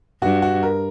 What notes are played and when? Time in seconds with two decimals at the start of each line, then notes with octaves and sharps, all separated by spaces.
0.22 G2 F#4
0.42 F#4
0.63 A#4